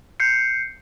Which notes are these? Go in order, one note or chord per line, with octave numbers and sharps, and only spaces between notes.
G6 C7 C#7